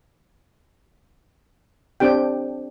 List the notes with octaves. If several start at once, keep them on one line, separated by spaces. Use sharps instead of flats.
C4 D4 G4 G5